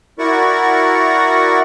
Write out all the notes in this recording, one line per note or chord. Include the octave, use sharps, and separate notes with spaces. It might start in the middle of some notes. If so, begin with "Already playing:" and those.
E4 F#4 A#4 D5 F#5 C#6